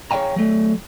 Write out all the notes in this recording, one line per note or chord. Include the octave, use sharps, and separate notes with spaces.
G#4 C#5 E5 F5 G5 A#5
F#3 A3